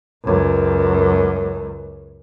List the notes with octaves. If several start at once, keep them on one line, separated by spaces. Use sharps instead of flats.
C#2 F#2